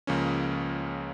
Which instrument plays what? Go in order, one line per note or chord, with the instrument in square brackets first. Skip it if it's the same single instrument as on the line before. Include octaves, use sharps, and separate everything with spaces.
[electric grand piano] C#2 C#3 F3 A#3 C#4